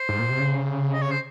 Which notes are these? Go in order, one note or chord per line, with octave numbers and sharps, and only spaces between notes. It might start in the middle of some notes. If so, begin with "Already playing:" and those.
Already playing: C5
G#2
A#2
C3
C#3
D#5
C#5
C5